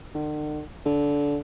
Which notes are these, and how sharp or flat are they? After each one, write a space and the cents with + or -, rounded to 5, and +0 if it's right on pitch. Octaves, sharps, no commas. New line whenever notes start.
D3 +45
D3 -20